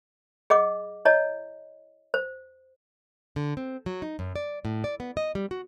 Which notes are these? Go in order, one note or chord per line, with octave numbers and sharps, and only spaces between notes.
G#4 D#5 F#5 D6
E4 C#5 D#5 A5
C5
D3
C4
F#3
D#4
F#2
D5
A2
D5
B3
D#5
G3
F#4